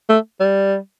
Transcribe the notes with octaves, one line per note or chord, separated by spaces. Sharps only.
A3
G3